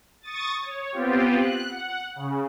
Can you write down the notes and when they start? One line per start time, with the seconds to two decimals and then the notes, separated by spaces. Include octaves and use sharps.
0.22 C#6 D#6 A6
0.61 C#5
0.92 B3 C4 F4 G4
1.37 F#6
1.68 F#5
2.16 C#3